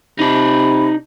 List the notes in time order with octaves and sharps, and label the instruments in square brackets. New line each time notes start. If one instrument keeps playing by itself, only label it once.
[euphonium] C3 [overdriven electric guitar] D#4 D5 [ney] B5